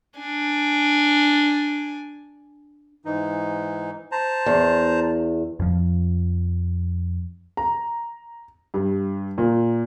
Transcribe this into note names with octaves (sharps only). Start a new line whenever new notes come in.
D4 G#5
G#2 E3 D#4
C5 A5 A#5
E2
F2 F3
A#5
G2
A#2